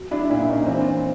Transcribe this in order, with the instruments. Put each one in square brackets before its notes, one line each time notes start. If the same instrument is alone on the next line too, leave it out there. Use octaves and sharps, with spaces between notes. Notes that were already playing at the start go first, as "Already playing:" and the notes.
Already playing: [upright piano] F#3
D4 E4
A#2 D4 E4
C#4 D#4
E3 C4 D4